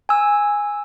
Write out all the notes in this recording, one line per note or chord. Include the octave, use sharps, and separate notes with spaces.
G#5 E6